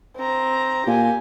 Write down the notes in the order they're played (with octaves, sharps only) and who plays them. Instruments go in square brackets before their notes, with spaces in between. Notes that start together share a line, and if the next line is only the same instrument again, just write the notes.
[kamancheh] C4 A#5
[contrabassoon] A#2 [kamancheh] G4 G#5